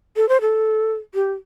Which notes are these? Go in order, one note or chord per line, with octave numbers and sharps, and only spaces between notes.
A4
C5
A4
G4